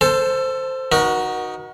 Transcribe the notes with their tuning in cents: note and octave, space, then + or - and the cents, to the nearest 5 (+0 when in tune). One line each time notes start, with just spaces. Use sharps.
A4 +25 C5 +0 A5 +0
D#4 +0 F#4 +0 A#4 +40